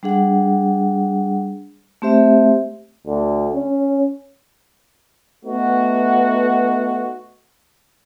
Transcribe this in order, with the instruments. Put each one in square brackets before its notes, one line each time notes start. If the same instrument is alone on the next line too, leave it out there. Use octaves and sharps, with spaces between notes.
[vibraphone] G3 D4 G#4 F#5
A3 C4 G4 C5 E5
[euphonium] D2
C#4
[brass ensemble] A3 B3 D#4 F#4